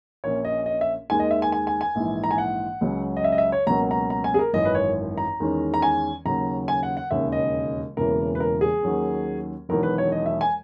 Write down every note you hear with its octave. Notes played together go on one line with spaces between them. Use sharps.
A#1 A#2 A#3 C#4 C#5
D#5
D#5
E5
D#2 D#3 G#3 G#5
D#5
E5
G#5
G#5
G#5
G#5
A#1 G#2 E3
A#5
G#5
F#5
C#2 C#3 F#3
D#5
E5
D#5
E5
C#5
C#2 B2 F#3 A#3 C#4 A#5
A#5
A#5
G#5
G#4
A#4
G#1 F#2 E3 D#5
B4
C#5
A#5
E2 D#3 G#3 C#4
A#5
G#5
D#2 C#3 F#3 A#5
G#5
F#5
F#5
E1 D#2 C#3 E5
D#5
E1 E2 C#3 E3 A#3 A#4
B4
A#4
G#4
D#2 D#3 F#3 C#4
E1 E2 D#3 F#3 A#4
B4
C#5
D#5
E5
G#5